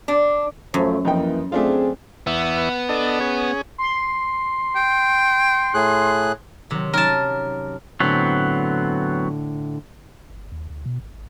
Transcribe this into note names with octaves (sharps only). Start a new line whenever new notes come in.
D4
F#2 F3 A3 C5
F2 E3 A#3 D#4 G5
A3 C4 D4 F4 G#4
E2 B3 E5
D4 A4 D#5
C#4 G#4
C6
G5
A2 G#4 F#6
C3 D#3 F#3
F#3 C#4 D#4 A#4 A5
A2 D3 F#3 B3 C4
G1
D#2
D2
B2
G#1
G#1